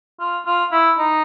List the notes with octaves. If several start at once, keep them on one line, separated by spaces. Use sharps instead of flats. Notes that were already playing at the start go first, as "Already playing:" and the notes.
F4
F4
E4
D#4